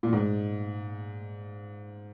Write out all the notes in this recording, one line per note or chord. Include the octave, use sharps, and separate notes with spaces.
A#2
G#2